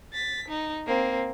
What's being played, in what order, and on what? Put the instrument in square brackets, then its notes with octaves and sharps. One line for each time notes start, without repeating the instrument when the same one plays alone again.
[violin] A6 B6
D#4
A#3 C4